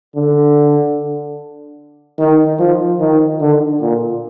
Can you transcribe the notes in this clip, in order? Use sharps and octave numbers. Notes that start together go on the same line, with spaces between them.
D3
D#3
F3
D#3
D3
A#2